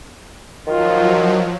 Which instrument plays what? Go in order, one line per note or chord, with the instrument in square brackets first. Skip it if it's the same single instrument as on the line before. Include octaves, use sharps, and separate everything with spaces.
[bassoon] D#3 [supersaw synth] F3 F#3 [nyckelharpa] F4